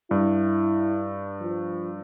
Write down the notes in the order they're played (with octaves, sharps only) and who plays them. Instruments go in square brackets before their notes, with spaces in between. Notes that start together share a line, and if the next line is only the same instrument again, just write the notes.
[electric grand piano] G2 [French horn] E4
[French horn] F3